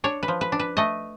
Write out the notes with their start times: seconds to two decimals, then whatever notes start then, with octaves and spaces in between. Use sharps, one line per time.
0.04 D4 C#5
0.23 B4
0.28 F3
0.41 B4
0.52 D4
0.59 B4
0.77 A3 D#5